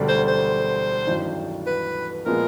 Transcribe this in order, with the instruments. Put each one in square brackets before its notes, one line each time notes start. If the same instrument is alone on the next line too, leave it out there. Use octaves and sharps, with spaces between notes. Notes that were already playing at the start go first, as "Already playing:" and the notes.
Already playing: [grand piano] E1 D2 D3 G3
[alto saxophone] C5
C5
[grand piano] A1 G2 D#3 F#3
[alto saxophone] B4
[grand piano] A#2 F3 G#3 B3 [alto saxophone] A#4